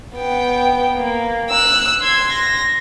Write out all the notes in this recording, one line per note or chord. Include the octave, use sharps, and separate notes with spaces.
B3 G5
A#3
E6 F#6
C6 G#6
A#6